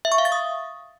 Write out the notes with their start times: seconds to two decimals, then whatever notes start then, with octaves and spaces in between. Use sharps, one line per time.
0.05 E5
0.12 C#6
0.18 F5
0.25 A6
0.32 D#6